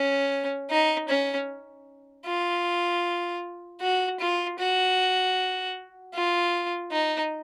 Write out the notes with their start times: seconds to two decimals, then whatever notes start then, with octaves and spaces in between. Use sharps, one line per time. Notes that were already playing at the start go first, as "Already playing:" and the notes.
Already playing: C#4
0.70 D#4
1.08 C#4
2.25 F4
3.81 F#4
4.20 F4
4.59 F#4
6.14 F4
6.92 D#4